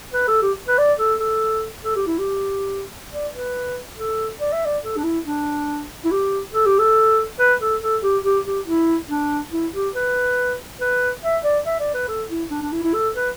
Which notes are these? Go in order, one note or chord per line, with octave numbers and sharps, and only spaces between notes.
B4
A4
G4
B4
D5
A4
A4
A4
G4
E4
G4
D5
B4
A4
D5
E5
D5
A4
D4
E4
D4
E4
G4
A4
G4
A4
B4
A4
A4
G4
G4
G4
E4
D4
E4
G4
B4
B4
E5
D5
E5
D5
B4
A4
E4
D4
D4
E4
E4
A4
B4